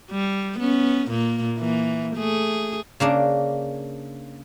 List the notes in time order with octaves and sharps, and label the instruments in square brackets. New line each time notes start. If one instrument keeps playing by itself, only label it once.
[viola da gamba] G3
B3 C#4
A#2 A#3
E3 A#3
A3 G#4
[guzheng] C#3 A#3 D4